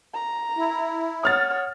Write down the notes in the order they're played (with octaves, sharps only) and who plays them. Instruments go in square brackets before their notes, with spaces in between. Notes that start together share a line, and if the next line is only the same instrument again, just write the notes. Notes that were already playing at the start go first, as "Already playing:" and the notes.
[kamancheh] A#5
[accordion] E4
[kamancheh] C#5 F#5 [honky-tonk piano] D#6 F6 A6